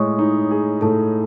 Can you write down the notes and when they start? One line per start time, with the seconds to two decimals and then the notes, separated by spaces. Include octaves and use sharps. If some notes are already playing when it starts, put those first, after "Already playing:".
Already playing: A2 G#3 C#5 D#5 C#6 D#6
0.19 D#4
0.51 G#4
0.81 A2 A4 A5